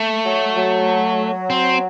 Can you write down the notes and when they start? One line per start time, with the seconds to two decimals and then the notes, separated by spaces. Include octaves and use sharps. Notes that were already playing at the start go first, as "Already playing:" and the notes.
Already playing: A3
0.24 F#3
0.56 F#3
1.50 C4